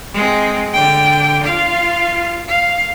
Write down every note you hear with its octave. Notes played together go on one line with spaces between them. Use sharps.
G#3 C4
D3 G5
F4 F5
F5